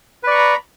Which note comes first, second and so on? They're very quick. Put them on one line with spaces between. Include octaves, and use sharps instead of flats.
B4 D5 C#6 A#5 B5